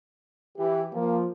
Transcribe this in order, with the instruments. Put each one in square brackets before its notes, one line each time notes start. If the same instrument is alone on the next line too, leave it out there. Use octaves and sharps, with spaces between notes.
[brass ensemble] E3 [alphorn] G4
[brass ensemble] F3 [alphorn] A#3